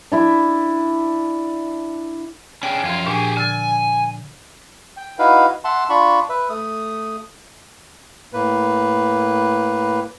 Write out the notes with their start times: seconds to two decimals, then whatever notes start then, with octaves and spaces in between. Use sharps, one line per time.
0.12 D4 E4 E5
2.63 C#4 D4 G#4 G5
2.84 F#2 F3 F4
3.06 A#2 D4 G4 G#4
3.37 D3 G#5 E6 A6
4.97 G5
5.19 D#4 E4 F#4 B4 F5
5.64 E5 F#5 A5 C6
5.89 D4 F4 B5 C#6
6.29 B4 E5
6.49 A3 D#6
8.33 A2 A#3 B4